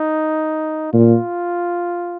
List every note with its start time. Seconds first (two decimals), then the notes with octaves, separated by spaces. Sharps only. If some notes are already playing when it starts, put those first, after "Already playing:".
Already playing: D#4
0.93 A#2 F4